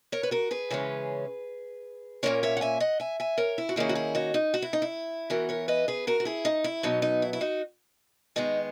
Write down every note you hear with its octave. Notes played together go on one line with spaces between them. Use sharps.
A#4 C#5
B4
F#4 A#4
G#4 B4
C#3 E3 G#3 C#4
A#2 A#3 C#4 A#4 C#5
C#5 E5
F#5
E5 G#5
D#5 F#5
E5 G#5
E5 G#5
A#4 C#5
E4
F#4
D#3 A#3 C#4 E4 G#4
F#4
E4 G#4
D#4 F#4
D#4
F#4
E4
D#4
E4
E3 B3 F#4 A#4
A#4 C#5
B4 D#5
G#4 B4
F#4 A#4
F#4
E4 G#4
D#4
E4
B2 F#3 B3 D#4
D#4
E4
E4
D#4 F#4
D#3 G#3 B3 D#4